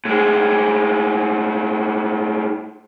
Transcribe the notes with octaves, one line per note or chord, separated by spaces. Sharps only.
A2 G#3